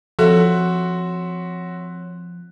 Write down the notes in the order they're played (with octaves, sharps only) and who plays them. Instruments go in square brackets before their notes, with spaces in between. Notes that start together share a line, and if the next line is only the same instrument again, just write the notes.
[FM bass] F3 [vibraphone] C4 C#5 C6 [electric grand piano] F#4 E5 F#6 [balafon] A4